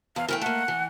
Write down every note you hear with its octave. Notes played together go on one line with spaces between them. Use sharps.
E2 F5
E3 A3 A#4 G5
A3 A#3 F#5
E3